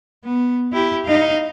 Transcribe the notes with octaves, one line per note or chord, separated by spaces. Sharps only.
B3
E4 G4
D#4 F5